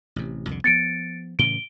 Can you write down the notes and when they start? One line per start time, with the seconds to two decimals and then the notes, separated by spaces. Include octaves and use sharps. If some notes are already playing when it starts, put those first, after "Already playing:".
0.16 A1 C3
0.47 C2 F2 D3
0.64 F3 B3 A6 C#7 D7
1.39 A2 C#3 E3 D7 G7